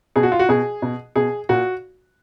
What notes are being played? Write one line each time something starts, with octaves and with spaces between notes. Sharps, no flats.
B2 G#4
F#4
F4
F#4
B2 G#4
B2
B2 G#4
A#2 F#4